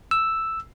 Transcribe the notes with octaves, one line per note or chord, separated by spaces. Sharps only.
E6